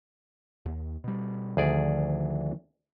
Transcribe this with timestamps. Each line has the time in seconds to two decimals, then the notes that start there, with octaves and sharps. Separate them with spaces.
0.66 D#2
1.04 B2 G3
1.57 D2 D#3 F3 G#4 D5